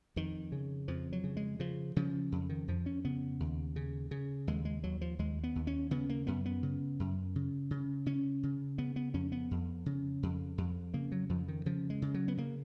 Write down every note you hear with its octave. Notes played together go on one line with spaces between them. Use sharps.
F2 D#3
C#3
F2 F3
F#3
C#3
G#3
C#3 F3
C#3 F3
F2
D#3
F2 F3
C#4
C#3 B3
D#2
C#3
C#3
D#2 G#3
G#3
D#2 F#3
F3
D#2 G#3
B3
D#2
C#4
C#3 B3
A#3
F#2 B3
B3
C#3
F#2
C#3
C#3
C#3 C#4
C#3
C#3 B3
B3
F2 C#4
B3
F2
C#3
F2
F2
C#3 A#3
F#3
F2 F3
D#3
C#3 F3
G#3
C#3
F#3
B3
C#3 A#3